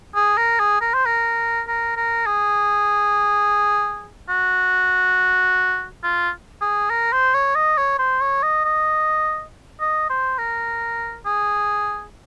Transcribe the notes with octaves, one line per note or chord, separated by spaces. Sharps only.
G#4
A#4
G#4
A#4
C5
A#4
A#4
A#4
G#4
F#4
F4
G#4
A#4
C5
C#5
D#5
C#5
C5
C#5
D#5
D#5
D#5
C5
A#4
G#4